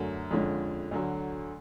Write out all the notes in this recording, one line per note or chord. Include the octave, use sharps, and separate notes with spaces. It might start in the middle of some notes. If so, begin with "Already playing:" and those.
Already playing: F#2 D3 F#3 A3 C#4
F2 D3 F3 G#3 C#4
D2 D3 F#3